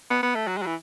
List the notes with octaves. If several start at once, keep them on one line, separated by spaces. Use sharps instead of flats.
B3
B3
A3
F#3
G#3
F#3
E3